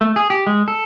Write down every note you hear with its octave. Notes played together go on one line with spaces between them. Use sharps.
A3
G#4
G4
G#3
A4